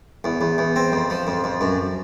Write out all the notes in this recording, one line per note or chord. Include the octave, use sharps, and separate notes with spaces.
E2
E2
E2
C4
F2
F3
F2
F2
F#2